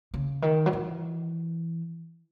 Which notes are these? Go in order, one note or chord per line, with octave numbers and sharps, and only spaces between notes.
C#3
D#3
F#3
E3